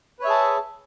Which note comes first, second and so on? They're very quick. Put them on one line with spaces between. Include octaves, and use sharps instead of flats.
B4 C#5 E5 G#4 A5